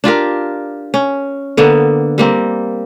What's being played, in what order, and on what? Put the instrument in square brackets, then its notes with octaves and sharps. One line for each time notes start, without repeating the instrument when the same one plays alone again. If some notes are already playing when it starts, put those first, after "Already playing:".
[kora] D4 F4 G4 A#4
C#4
D3 A#3 B3
G3 A#3 C4